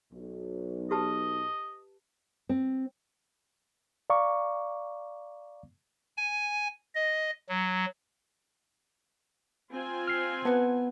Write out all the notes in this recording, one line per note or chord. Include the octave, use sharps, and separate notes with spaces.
B1
G4 B4 D#5 A5
C4
D5 F5 A#5 C#6 D6
G#5
D#5
F#3
C4 F4 G#5
F6 C7
B3 B4 F#5 A5